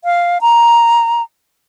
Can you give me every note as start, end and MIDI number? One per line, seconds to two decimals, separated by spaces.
0.04 0.38 77
0.41 1.22 82